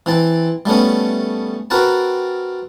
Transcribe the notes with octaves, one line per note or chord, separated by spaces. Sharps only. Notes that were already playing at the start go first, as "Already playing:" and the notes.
E3 C4 A5
G3 A3 B3 C#4
C4 F#4 A#4 B4 A5